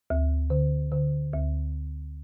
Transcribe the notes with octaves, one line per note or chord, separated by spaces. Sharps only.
D2
D3
D3
D2